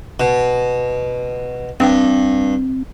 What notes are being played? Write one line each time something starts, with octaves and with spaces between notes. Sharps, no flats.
B2
G2 C4